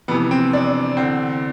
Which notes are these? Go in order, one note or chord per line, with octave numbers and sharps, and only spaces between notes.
F2 C3 E3 B3
C4
D4
E2 D3 C4